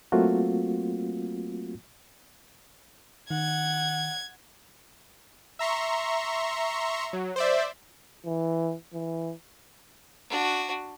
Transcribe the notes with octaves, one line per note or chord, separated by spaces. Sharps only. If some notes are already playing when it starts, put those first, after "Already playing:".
F#3 A3 A#3 C4 F4 F#4
D#3 F#5 G#6
E5 A#5 C6 C#6
F#3
C5 D5 E5
E3
E3
D4 F#4